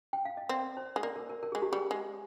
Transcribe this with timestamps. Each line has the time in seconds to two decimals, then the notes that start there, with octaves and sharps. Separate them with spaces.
0.13 G5
0.25 F5
0.37 D#5
0.49 C4 D5
0.77 C5
0.96 G#3
1.03 A#3 D5
1.16 A#4
1.29 A#4
1.43 A#4
1.52 G#3 G#4
1.62 G4
1.72 G3 G#4
1.91 G#3